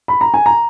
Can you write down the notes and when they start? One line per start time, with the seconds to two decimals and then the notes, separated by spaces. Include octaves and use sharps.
0.08 B5
0.21 A#5
0.34 G#5
0.46 A#5